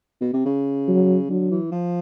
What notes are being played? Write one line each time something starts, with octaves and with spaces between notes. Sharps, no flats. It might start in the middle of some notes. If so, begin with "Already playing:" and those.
B2
C3
C#3
F#3
D3 F#3
E3
F3